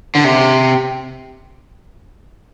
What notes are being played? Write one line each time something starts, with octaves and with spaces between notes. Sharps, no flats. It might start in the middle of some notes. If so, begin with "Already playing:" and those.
D3
C3